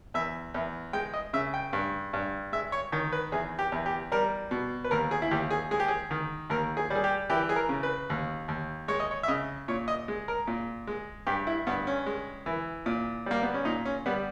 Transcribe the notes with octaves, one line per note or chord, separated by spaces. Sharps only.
E2 E5
E2
G#3 G5
D#5
C#3 E5
G5
G2
G2
G#3 E5
C#5
D#3 C#5
B4
E2 G#4
G4
E2
G4
G3 A#4
B2
B4
D#2 A#4
G#4
E4
D#2 G4
G#4
G#3 G#4
G4
G#4
D#3
D#2 A#4
G#4
G3
G#4
G4
E3 G4
G#4
A#4
C#3
B4
D#2
D#2
G#3 C#5
D#5
C#5
E5
C#3 D#5
A#2 C#5
D#5
G#3
A#4
A#2
G#3
G2 G4
E4
G2 B3
C#4
G#3
E3
A#2
G3 A#3
B3
C#4
A#2 D#4
C#4
G3 B3